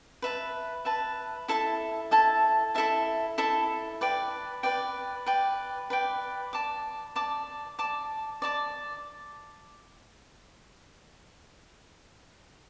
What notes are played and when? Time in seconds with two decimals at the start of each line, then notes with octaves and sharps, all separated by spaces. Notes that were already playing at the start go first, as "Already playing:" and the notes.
0.22 B4 E5 A5
0.85 B4 E5 A5
1.48 E4 A4 E5 A5
2.11 E4 A4 E5 A5
2.75 E4 A4 E5 A5
3.38 E4 A4 E5 A5
4.01 B4 D5 G5
4.63 B4 D5 G5
5.26 B4 D5 G5
5.90 B4 D5 G5
6.53 D5 A5 D6
7.16 D5 A5 D6
7.79 D5 A5 D6
8.42 D5 A5 D6